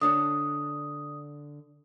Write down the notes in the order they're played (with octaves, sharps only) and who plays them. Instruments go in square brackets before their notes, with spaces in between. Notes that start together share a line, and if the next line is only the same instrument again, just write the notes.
[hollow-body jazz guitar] D3 D4 C#5 [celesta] D#6